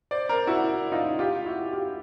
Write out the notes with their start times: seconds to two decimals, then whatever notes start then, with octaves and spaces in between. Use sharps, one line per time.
0.11 C5 D5
0.29 A#4 C5
0.47 E4 F#4
0.92 D#4 F4
1.19 F4 G4
1.46 E4 F#4
1.73 F4 G4